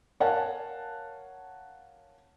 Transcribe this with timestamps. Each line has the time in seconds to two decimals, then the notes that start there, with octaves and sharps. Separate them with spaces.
0.20 A#4 C#5 F5 F#5 G#5 A5